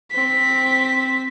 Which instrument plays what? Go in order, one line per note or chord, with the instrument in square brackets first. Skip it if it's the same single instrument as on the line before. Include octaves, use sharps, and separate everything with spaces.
[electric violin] C4 B6